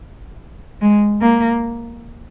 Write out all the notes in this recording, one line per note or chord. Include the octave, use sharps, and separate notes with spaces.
G#3
A#3